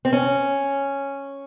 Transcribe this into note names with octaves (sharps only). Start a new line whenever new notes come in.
C4
C#4